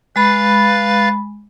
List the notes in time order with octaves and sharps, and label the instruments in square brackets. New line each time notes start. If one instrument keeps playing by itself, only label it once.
[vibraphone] G#3 B5 [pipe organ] B4 F5 A6